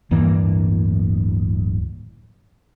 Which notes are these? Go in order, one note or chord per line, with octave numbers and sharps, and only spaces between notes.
D1 G2 E3 A#3